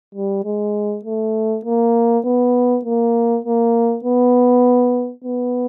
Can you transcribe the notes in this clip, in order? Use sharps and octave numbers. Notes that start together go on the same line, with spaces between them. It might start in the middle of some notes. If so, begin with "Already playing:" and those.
G3
G#3
A3
A#3
B3
A#3
A#3
B3
B3